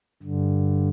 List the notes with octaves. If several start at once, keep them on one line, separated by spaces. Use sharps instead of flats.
G2 D3